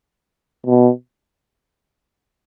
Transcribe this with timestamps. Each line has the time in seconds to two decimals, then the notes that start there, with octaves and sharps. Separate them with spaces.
0.66 B2